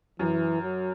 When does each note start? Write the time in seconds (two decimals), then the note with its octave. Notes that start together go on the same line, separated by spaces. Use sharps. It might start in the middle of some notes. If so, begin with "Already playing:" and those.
0.19 F#2 E3
0.63 F#3